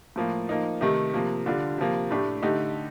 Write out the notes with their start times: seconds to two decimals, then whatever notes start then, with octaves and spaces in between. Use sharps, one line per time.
0.16 A2 F3 A#3
0.49 F3 A#3 D#4
0.81 C3 D#3 A3 D#4 G4
1.13 C3 F3 A#3
1.46 D3 G3 D4 F4
1.78 C3 F3 A#3
2.11 A2 A3 D4 G4
2.42 D3 A3 D#4 G4